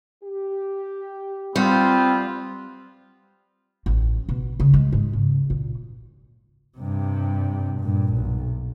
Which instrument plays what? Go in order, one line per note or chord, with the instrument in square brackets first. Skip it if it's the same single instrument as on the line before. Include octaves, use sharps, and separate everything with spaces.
[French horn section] G4
[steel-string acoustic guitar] G3 [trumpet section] B3 F4 [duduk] C4
[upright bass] A1
B2
C#3
G#3
G#2
C#3
A#2
[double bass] G2 C3
G2 A#2
B1